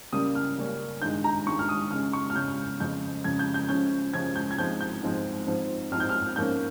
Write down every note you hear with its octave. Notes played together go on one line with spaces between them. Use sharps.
C#3 G3 A#3 C#4 D#6
F6
C#3 G3 A#3 C#4
G2 D#3 G#3 G6
A#5
G2 D#3 G#3 C#6
F6
D#6
C#3 G#3 C#4 F6
C#6
F6
C#3 G#3 C#4 G6
F2 C#3 G#3 G6
F2 C#3 G#3 G#6
G6
G6
C#3 F3 G#3 C#4 G6
C#3 F3 G#3 C#4 G#6
G6
G#6
G#2 F3 G#3 C4 G6
G6
G#2 F3 G#3 C4
G#2 F3 C4
G#2 F3 C4 F6
G6
F6
G#2 F3 A#3 C#4 G6